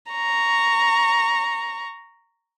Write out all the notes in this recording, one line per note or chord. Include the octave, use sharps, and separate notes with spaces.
A#5 C#6